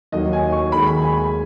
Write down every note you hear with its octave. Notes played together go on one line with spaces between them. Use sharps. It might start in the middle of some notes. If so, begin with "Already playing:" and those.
D#2 D#3 F#3 D#5
G#5
C#6
D#2 D#3 G#3 B5
B5
G#5